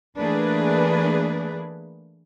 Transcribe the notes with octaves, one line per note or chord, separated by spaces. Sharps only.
E3 A3 A#3 D4 G#4 B4